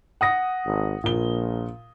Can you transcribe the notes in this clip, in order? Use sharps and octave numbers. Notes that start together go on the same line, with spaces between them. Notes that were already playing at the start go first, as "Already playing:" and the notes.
F#5 D#6 A#6
G#1
A#1 A#2 G7